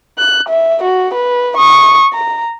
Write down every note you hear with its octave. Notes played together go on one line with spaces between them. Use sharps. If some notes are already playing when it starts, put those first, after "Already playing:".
F#6
E5
F#4
B4
C#6 D#6
A#5